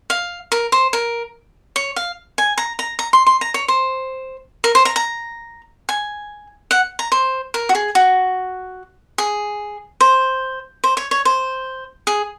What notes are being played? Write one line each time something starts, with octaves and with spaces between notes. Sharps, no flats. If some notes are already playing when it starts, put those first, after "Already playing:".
F5
A#4
C5
A#4
C#5
F5
G#5
A#5
A#5
A#5
C6
C6
A#5
C#5
C5
A#4
C5
A#5
A#5
G#5
F#5
A#5
C5
A#4
F#4
G#4
F#4
G#4
C5
C5
C#5
C#5
C5
G#4